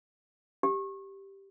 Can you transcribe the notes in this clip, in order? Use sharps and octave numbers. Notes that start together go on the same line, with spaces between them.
G4